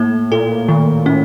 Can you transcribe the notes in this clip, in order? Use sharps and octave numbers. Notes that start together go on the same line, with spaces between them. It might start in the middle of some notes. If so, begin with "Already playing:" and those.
Already playing: A2 A#3
A#2 A4
A#2 D#3
A2 C#4